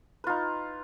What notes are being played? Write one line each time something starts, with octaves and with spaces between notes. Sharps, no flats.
D#4 F4 B4